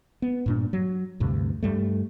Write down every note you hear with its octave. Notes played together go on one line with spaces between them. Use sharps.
B3
G2 A#2 D4
F#3
D2 G2 C3
G2 G3 A3